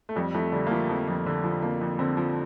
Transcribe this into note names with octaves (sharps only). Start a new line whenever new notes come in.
A3
F2 G3
F2 A3
D3 G3
A#3
F3 A3
F2
F2
D3
F3
F2 A#3
F2
D3 C4
F3